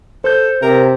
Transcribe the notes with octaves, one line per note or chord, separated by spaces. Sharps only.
A4 C5 G6
C3 A#4